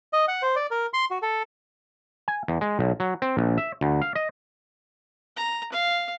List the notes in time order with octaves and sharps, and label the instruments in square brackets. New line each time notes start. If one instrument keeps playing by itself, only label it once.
[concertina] D#5
F#5
C5
D5
A#4
C6
F#4
A4
[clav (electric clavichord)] G#5
E2
G#3
B1
F#3
C4
A#1
E5
D2
F5
D#5
[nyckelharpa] A#5
F5